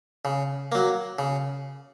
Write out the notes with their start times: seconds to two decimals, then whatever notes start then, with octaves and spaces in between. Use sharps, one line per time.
0.25 C#3
0.72 F#3 A#3
1.19 C#3